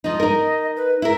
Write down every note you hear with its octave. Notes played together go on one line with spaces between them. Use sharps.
F3 D#4 D#5
D#4 A#4
B4
E4 A#4 E5